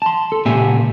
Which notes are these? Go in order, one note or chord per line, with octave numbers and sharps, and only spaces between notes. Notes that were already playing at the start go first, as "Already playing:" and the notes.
A5 C6
A4
C#2 A#2 G4 E5 G#5